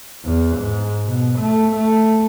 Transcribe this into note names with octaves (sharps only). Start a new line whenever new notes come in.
E2
G#2
B2
A3
A3